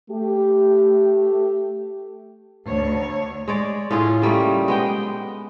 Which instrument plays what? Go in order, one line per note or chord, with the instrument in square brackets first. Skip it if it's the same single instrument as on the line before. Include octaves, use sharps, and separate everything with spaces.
[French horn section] A3 G4
[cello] D2 C#5
[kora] G#3 C#5 D5
A2 C#4 F4 G#4
C#3 G3 A3 A#3
G#3 B3 G5